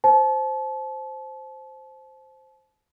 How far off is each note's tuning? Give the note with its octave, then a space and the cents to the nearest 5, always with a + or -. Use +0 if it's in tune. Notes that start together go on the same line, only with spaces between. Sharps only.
C5 +0 A5 -35